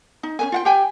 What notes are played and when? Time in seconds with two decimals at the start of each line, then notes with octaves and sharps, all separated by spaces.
0.23 D#4
0.39 C#4 B4 G#5
0.52 F4 F#5 G5
0.65 G4 G5 G#5